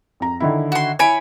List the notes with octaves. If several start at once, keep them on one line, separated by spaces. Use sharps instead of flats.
F2 A#5
D3 D#3 E4
F#4 C6
E4 C#5 G#5 B5 D7